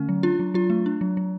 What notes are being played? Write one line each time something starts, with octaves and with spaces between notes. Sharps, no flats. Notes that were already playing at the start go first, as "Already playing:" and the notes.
Already playing: D3 A3 C#4
F#3
D4 F4
F#3
F#3 F4
A3
D4
F#3
F#3